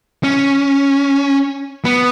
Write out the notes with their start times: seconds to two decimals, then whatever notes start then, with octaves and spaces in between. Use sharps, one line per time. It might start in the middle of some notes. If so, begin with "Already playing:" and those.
0.24 C#4
1.85 B3